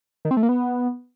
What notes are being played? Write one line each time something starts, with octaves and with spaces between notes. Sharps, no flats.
D#3
C4
A3
A#3
B3